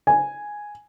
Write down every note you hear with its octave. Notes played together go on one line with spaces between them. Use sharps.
G#5